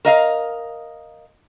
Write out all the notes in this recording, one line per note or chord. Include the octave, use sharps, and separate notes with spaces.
A#4 D#5 F5